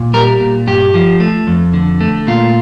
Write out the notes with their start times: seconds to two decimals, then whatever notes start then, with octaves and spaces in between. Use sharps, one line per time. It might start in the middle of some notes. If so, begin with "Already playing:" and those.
Already playing: A#2
0.14 G3 A#4
0.40 A#2
0.67 G2 G4
0.94 F3
1.20 A3
1.47 F2
1.74 D3
2.00 A3
2.27 A#2 F4